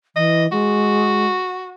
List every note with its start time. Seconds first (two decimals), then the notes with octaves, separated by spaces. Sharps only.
0.16 E3 D#5
0.52 G#3 F#4